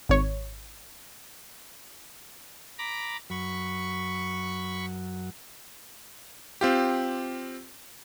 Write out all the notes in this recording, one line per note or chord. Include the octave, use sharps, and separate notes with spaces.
G#1 C#5
A#5 B5 D6
F#2 F#3 B5 C#6
C4 F4 G4